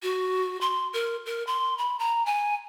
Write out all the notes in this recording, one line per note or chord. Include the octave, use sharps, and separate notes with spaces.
F#4
C6
A#4
A#4
C6
B5
A#5
G#5